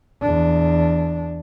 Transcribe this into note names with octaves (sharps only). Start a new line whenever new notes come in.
E2 D4